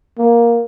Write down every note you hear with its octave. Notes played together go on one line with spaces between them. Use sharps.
A#3